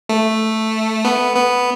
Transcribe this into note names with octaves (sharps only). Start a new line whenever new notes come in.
A3
B3
B3